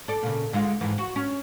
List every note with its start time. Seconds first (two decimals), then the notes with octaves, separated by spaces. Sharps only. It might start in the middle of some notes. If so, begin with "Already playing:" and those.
0.08 A4 D5
0.23 A#2 C#3
0.53 D3 G#3 F4
0.81 F2 G#2 E3
0.98 F#4
1.16 C#4